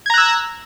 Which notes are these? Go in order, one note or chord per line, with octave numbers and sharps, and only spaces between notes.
A#5 E6 F#6 G#6